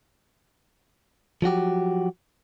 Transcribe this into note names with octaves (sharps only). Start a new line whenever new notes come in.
F3 F#3 F#4 G4